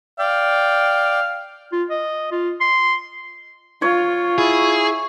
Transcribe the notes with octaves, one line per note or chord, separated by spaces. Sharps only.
D5 F5 G5
F4
D#5
F4
C6
F4 C#5
E4 G#4